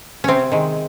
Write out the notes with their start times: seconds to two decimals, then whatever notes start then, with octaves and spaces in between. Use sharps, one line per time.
0.24 C3 C4 C#4
0.52 D#3 G#3